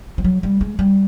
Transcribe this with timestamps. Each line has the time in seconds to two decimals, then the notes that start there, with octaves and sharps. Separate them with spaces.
0.18 F3
0.24 F#3
0.43 G3
0.61 G#3
0.79 G3